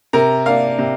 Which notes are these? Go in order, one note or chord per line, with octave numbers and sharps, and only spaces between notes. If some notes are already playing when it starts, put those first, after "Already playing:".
C3 A#4 A#5
A#3 D4 F5
C3